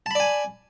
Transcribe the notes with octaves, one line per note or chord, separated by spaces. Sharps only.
D5 G#5 A5 B5